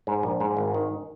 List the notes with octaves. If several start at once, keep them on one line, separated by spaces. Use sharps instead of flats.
G#2
A#1
G#2
G#1
D#3